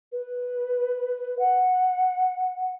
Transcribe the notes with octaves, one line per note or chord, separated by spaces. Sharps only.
B4
F#5